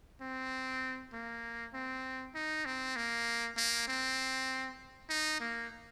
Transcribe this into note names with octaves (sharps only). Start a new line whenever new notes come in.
C4
A#3
C4
D#4
C4
A#3
A#3
C4
D#4
A#3